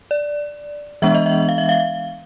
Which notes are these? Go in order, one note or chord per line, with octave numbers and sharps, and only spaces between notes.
D5
E3 G#3 B3 D4 E5
D#5
E5
F5
E5
F5